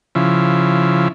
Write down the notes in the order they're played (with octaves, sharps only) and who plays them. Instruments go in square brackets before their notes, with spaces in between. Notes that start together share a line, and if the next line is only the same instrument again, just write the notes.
[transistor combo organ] C#3 F3 E4